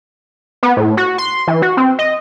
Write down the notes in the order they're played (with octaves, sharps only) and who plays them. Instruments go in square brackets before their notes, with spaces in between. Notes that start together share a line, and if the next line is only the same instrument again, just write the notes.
[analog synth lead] B3
A2
F#4
C6
E3
F#4
C4
D#5